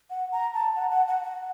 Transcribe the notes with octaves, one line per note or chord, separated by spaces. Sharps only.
F#5
A#5
A5
F#5
F#5
F#5
F#5